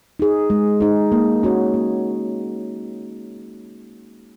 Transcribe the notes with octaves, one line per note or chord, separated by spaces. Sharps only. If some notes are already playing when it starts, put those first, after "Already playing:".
D#4 G#4
G#3
D#4 G#4
A#3
C#4 F#4 C#5
A#3